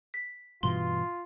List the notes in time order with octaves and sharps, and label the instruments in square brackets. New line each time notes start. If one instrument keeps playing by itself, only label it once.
[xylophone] B6
[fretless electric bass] G2 B2 E3 [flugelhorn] F4 [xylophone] C6